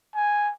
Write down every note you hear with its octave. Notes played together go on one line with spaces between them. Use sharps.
G#5